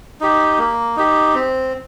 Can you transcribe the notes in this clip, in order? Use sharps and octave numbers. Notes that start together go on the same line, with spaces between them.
D#4 G4
A#3
D#4 G4
C4